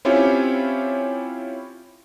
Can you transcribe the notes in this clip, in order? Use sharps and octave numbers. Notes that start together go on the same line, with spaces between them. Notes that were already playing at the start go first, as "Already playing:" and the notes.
C4 C#4 E4 F4 G4 C#5